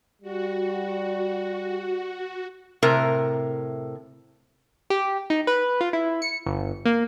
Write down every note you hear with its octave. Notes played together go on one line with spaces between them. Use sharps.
G3 F#4
A2 C3 A#4
G4
D#4
B4
F4
E4
C#7
G1
A#3